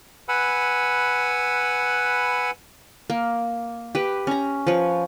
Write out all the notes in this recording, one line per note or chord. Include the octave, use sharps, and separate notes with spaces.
B4 F#5 G#5 B5 E6
A#3
G4 B4
C#4 A#5
F3 B4 C#5